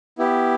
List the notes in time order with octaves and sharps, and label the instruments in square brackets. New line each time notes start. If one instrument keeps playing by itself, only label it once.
[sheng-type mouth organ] B3 E4 G4